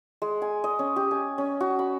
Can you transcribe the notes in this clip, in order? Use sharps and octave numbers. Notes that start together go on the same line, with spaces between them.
G#3
G#5
D#5
C#4
G4
G#5
C#4
F#4
B5